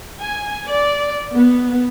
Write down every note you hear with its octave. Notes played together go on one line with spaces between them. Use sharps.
G#5
D5
B3